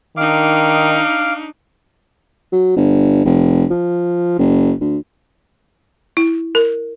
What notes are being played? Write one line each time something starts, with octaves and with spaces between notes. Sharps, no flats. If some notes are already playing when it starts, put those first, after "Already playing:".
D#3 D4 D#4 F5 D6
F#3
G1
F1
F3
F#1
D2
E4
A#4